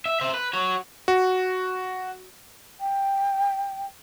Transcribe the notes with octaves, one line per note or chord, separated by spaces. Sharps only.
E5
C5 E5
B4
F#4 C#5
F#4
G5